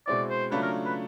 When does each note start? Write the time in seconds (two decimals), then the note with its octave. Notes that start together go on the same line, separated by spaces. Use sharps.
0.07 B2 G#3 C4 E4 D5
0.30 C5
0.51 C#3 F#3 A3 D4 F4 B4
0.63 A#4
0.85 B4